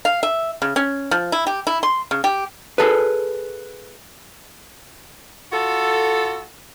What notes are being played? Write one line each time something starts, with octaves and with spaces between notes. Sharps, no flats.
F5
E5
C#3
C#4
F3
E4
G4
E4
C6
C#3
G4
G#4 A4 B4
F4 F#4 A4